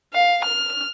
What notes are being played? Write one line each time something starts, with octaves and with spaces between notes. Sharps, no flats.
F5
F6